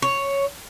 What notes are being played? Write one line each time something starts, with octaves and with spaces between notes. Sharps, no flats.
C#5